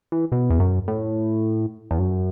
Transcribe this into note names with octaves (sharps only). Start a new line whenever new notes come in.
E3
B2
E2
F#2
A2
E2
F#2